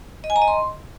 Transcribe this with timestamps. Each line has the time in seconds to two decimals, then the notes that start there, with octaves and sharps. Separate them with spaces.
0.24 D#5
0.30 G#5
0.36 A#5
0.42 D#5
0.48 C6